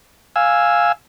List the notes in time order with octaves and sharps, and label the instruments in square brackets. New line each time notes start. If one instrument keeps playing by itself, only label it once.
[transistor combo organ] F5 G#5 E6